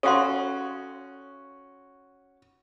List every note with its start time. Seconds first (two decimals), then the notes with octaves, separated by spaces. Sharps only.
0.03 C#4 F#4 A4 F5 C6